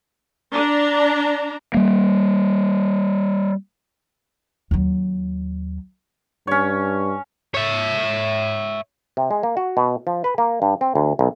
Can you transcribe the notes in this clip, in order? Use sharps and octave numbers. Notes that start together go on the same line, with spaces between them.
D4 A#5
G3 A#3
D#2 F#3
G2 C#4 C#5
C#5 E5
C3
G#3
A#3
F#4
B2
F3
B4
A#3
G2
C4
D2
B1